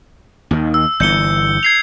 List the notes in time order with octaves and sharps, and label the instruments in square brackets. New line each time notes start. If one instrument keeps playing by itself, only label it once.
[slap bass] D#2 D#3
[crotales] E6
[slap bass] G1 E3 [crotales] G6 C#7 G7
[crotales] G#6 C7 F7